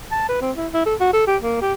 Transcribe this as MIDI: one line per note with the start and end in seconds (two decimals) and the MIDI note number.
0.11 0.27 81
0.29 0.41 71
0.42 0.51 60
0.57 0.68 64
0.73 0.82 64
0.86 0.95 69
1.00 1.12 66
1.13 1.25 69
1.27 1.37 67
1.43 1.59 58
1.62 1.73 67